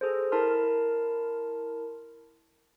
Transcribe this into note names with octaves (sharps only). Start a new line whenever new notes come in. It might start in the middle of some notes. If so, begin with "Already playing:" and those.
G#4 A4 C5
E4 A#4 A5 C6 F6